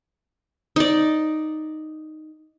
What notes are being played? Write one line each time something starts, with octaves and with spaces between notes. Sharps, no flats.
D#4 D5